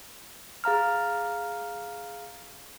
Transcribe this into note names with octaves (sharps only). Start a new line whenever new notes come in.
G#4 F5 A#5 F6